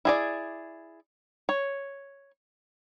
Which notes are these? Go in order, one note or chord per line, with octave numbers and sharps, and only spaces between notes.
E4 G#4 D5
C#5